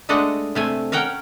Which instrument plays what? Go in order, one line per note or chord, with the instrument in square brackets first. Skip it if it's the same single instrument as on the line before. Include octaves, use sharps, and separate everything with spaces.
[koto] G#3 A3 D4 D#5 F#5
C3 A3 G#5
C#4 A#4 F#5 G5